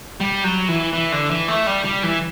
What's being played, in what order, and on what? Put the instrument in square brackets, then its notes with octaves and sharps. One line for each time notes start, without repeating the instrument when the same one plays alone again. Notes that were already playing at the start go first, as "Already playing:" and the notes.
[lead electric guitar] G3
F#3
E3
E3
D3
E3
A3
G3
G3
E3